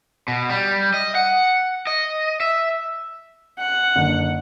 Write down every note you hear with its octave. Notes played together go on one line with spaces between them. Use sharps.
B2
G3
D#5
F#5
D#5
E5
F#5
F#1 D3